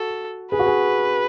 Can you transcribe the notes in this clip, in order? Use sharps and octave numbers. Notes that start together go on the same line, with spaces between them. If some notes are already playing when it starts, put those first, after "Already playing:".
Already playing: F#4 A4
G#4 B4
F#4
G#4